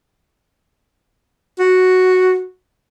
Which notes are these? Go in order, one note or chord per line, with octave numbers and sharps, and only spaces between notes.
F#4